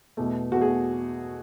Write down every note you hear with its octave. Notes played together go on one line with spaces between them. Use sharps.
E2 B2 A3
E2 B2 A3 F#4
G#4